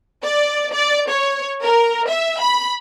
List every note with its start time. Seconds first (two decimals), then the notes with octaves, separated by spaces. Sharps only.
0.23 D5
0.74 D5
1.11 C#5
1.62 A#4
2.09 E5
2.40 B5